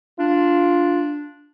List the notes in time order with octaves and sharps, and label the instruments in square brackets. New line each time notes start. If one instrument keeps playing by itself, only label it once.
[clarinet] D4 [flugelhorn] F4